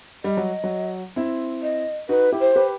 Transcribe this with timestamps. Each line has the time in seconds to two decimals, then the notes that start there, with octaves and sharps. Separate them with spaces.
0.24 G3 D#5
0.37 F#3
0.64 F#3
1.16 C4 E4
1.63 D#5
2.09 D#4 F#4 B4
2.32 E4 G4
2.40 C5
2.56 G4 B4